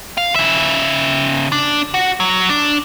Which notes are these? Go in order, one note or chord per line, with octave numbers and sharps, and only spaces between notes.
F5
C#3 E5
D4
F#4
F#3
D4